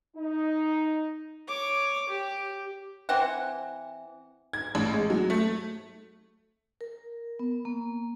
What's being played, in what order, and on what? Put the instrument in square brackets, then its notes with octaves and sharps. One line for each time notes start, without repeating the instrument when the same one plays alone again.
[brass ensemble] D#4
[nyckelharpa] C#5 D6
G4
[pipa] E3 C4 F#5
[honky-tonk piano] G#6
A1
G#3
F#3
A3
[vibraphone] A#4
B3
A#3